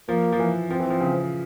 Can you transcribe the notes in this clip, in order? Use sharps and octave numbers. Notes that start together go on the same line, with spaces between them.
F3 A#3
F3
E3
F3 C4
E3
F3
C#3